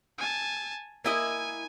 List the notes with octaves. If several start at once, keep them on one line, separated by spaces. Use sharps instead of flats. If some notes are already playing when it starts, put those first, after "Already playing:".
G#5 A5
A#3 E4 D#5 G#5